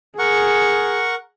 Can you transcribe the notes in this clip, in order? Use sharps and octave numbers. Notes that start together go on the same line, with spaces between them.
G#4 A#4 F#5 C#6